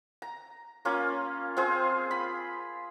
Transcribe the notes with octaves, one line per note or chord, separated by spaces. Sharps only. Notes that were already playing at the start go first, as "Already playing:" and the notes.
A#5
A#3 C#4 F4
C4 F4 G#4 C5
B5